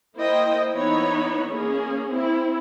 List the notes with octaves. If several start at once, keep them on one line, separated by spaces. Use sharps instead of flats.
A#3 E4 C5 D#5 G5
E3 B3 D#4 C#5 B5
A#3 C#4 G#4
C4 E4